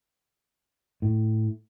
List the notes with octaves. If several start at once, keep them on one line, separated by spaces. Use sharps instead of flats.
A2